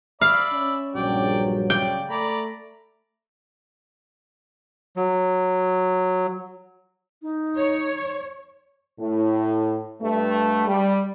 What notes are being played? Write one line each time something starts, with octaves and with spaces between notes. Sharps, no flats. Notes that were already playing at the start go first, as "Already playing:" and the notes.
D5 E5 F5 B5
C#4
A#1 G2 F#3 D5 G5
C#3 D5 G5
A3 D5 A#5 B5
F#3
D#4
C#5
A2
G2 A3
G3